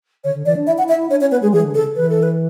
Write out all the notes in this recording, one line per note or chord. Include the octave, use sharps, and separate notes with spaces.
D3 C#5
D3
E3 D5
D4
E4 E5
F#5
E4
E5
E4
D4 C#5
C#4 C#5
B3 B4
G#3 G#4
E3 G#4
D3
C#3 A4
E3 B4
A4
B4